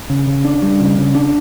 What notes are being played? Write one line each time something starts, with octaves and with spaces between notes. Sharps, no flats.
C#3
C#3
D4
G3
C#3
C#3
D4